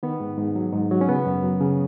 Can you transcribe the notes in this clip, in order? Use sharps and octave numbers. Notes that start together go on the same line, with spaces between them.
D#3 B3
G#2
G#2
F#3
G#2
F#3
C#4
C#3 B3
F#2
F#3
C#3